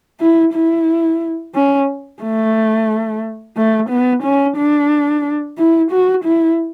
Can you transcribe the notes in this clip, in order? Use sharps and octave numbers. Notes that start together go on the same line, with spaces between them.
E4
E4
C#4
A3
A3
B3
C#4
D4
E4
F#4
E4